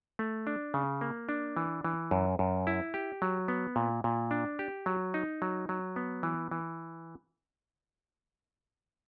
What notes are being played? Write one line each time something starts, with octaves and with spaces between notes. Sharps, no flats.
A3
D4
C#3
A#3
D4
E3
E3
F#2
F#2
E4
G4
F#3
B3
A#2
A#2
D4
G4
F#3
D#4
F#3
F#3
B3
E3
E3